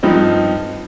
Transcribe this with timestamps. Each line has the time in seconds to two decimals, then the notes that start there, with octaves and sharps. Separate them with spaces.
0.03 G2 F3 C4 D#4